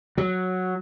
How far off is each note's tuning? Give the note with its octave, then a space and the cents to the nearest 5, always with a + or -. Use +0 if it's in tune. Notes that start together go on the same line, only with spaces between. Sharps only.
F#3 -5